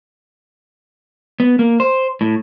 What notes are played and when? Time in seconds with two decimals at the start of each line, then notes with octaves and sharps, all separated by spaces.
1.40 B3
1.59 A#3
1.80 C5
2.21 A2